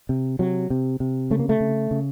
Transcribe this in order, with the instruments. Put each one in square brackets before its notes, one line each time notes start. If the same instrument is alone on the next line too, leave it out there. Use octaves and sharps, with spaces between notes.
[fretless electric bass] C3
C3 F#3
C3
C3
C#3 A3
A#3
A3
C#3
C#3